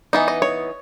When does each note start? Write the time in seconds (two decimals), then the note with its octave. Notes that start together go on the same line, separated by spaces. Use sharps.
0.13 E3 B3 D#4
0.28 D#5
0.42 C#5